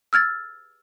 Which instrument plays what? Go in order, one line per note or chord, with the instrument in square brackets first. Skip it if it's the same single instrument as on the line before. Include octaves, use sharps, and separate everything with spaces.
[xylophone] E6 F6 G#6 A6